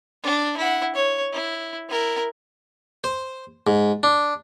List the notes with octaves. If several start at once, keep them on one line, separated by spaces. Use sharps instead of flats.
D4
E4 F#5
C#5
E4
E4 A#4
C5
G#2
D4